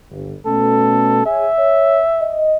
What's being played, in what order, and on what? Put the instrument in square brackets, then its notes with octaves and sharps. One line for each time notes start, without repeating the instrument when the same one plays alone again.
[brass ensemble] G1
[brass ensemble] B2 A3 C#4 [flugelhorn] A4
[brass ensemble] G#4 C#5 G#5 [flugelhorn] E5
[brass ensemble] C#5
D#5